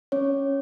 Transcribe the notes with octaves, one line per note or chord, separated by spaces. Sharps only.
C#4 C#5